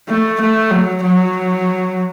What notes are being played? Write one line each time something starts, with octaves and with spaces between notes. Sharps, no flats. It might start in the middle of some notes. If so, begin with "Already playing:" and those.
A3
A3
F#3
F#3